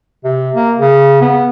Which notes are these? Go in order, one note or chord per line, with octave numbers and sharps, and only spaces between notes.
C3
A#3
C#3
B3